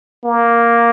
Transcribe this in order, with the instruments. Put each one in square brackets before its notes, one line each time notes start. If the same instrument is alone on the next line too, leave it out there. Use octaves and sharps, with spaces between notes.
[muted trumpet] A#3